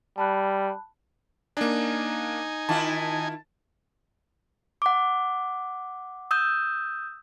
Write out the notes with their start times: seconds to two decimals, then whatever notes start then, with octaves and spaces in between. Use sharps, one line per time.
0.18 G3 A5 B5 F#6
1.57 A#3 D4 D#4 G#5
2.69 D#3 E4 F4 A5
4.82 F#5 D6
6.31 D#6 E6 G6